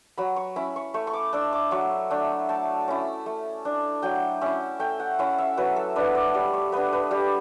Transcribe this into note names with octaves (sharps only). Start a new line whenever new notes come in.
F#3 B5
C#6
C#4 E4 B5
C#6
A3 C#6
C#6
D6
D4 E6
D6
F#3 C#6
A3 D4
A3 A5
C#4 E4
A3
D4
F#3 G5
C#4 E4 E5
A3 G5
F#5
C#4 E4
E5
F#3 B4
A4
B3 D4 B4
D5
G3 D5
C#5
B3 D4 B4
B4
G3 G4